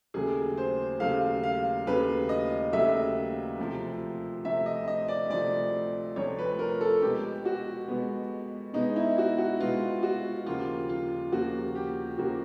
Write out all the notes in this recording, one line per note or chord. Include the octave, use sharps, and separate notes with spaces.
D#2 C#3 F#3 A3 G#4
C5
D#2 C#3 F#3 A3 F5
F5
D#2 C#3 F#3 A3 B4
D#5
D#2 C#3 F#3 A3 E5
D2 C3 F3
D2 C3 F3 E5
D#5
D#5
D5
D2 C3 F3 D5
D2 C3 F3 C#5
B4
A#4
A4
B2 G#3 B3 G4
F#4
B2 G#3 B3
B2 G#3 B3 D#4
E4
F#4
F#4
B2 G#3 B3 F4
F#4
D#2 C#3 F3 A#3 F4
F4
D#2 C#3 F3 A#3 F#4
G4
D#2 C#3 F3 A#3 F#4